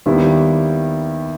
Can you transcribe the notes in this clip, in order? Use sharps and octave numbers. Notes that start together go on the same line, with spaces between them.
D#2 D#3 G3 B3 E4